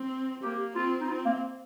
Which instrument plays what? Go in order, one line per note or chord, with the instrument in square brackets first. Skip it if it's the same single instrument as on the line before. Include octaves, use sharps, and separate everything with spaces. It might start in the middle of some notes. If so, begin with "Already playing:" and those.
Already playing: [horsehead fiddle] C4
[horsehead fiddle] A#3 [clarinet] G4
[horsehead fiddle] C4 [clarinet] F4
[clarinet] D#4
[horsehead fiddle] C4 [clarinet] F4
[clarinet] A#3